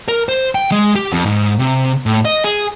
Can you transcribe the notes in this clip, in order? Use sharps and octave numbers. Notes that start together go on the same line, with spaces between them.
A#4
C5
G5
G#3
G4
F2
G#2
C3
A2
D#5
G#4